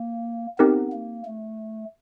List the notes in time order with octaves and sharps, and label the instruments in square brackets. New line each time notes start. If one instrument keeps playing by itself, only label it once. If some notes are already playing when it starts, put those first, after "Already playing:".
Already playing: [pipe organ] A#3
[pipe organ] B3 [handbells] C4 D#4 G4 A#4
[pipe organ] A#3
A3